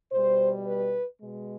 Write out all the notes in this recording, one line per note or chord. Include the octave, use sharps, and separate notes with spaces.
B2 G3 C5
B4
B2 G#3